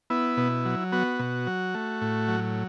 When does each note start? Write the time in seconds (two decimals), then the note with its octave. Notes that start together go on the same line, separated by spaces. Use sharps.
0.10 B3 E4
0.37 B2
0.65 F#3
0.92 B3 F#4
1.19 B2
1.47 F#3
1.74 A3
2.01 A2
2.28 F#3